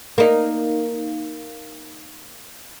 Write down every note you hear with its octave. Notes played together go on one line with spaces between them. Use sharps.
A#3 D#4